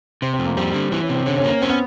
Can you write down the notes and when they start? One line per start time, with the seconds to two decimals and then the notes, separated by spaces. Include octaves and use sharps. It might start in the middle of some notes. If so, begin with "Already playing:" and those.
0.22 C3 C4
0.34 C4
0.39 F2
0.45 A#3
0.57 G3 C4
0.74 D3
0.91 E3 C4
1.03 C#4
1.09 C3
1.15 C4
1.26 D3 C#4
1.38 C#4
1.44 A#3
1.50 C#4
1.62 C4 C#4
1.69 B3